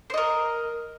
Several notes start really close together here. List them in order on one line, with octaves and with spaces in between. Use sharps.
C5 D#5 A#4